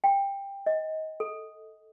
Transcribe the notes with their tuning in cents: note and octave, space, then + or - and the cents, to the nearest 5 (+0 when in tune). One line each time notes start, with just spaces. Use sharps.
G5 +15
D#5 +20
A4 +0